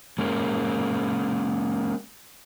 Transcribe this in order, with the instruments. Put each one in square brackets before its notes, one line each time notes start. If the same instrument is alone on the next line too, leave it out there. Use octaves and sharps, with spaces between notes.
[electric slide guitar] G#3 A#3 C#4